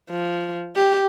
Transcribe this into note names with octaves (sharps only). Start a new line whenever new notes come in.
F3
G4